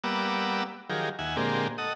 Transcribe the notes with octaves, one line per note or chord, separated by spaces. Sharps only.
G3 A#3 B3 F#5 D6 E6
D#3 F3 F#3 G4 G#4 A#4
D#2 E5 F#5 G#5
A#2 D3 G#3 A#3 C4 G4
A4 D#5 F#5 D#6